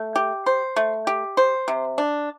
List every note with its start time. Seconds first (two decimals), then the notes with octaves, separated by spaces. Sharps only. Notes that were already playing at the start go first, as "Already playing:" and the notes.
Already playing: A3
0.16 G4
0.46 C5
0.76 A3
1.07 G4
1.37 C5
1.68 C3
1.98 D4